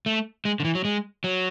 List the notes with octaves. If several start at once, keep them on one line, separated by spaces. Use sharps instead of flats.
A3
G#3
D3
E3
F#3
G#3
F#3